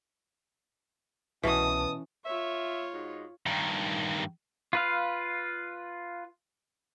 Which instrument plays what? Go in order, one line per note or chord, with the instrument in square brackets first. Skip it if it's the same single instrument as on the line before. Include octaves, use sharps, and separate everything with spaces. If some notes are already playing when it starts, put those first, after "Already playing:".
[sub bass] C2 [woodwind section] B2 [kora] E3 C#4 [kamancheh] A5 D#6
[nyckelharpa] F4 C#5 [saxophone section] E5
[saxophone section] G#2 D#4 F#4
[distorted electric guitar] G2 D#3
[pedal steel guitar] F4 B4 F5